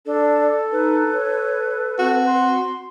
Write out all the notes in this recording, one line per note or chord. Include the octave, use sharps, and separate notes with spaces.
D4 A4
D#4 B4
C#5
C4 F#4 A4
C6